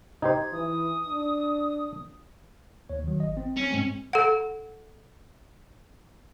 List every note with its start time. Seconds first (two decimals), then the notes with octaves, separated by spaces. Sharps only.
0.22 D#4 G4 C5 G#6
0.52 E3 D#6
1.08 D4
2.90 D#2 C#5
3.04 D#3 F#3
3.20 G#1 D#5
3.37 C4
3.57 C#4
3.70 G#2 G#3 C4
4.13 A4 F#5